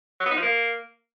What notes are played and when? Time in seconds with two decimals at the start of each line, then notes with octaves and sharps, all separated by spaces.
0.20 F#3
0.26 B3
0.31 D#4
0.37 F3
0.43 A#3